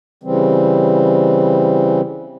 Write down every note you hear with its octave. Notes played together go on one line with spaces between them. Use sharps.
C#3 E3 G3 C4